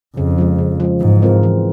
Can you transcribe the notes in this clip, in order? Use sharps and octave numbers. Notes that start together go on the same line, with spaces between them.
F2 C#3
F3 G#3
C#3
F3 G#3
G#2 E3
G#3 C4 F4 A#4
E3